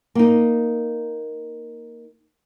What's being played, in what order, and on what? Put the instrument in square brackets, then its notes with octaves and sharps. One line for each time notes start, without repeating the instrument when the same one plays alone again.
[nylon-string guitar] A#3 D#4